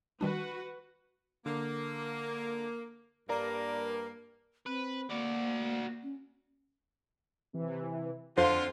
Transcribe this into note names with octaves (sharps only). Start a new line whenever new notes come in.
D#3 G3 D4 F#4 B4
D3 A#3
G2 A#3 A#4 D5 A#5
C4 B4
A#3 F#4 D5
C#4
C3 E3
F2 D3 F4 C5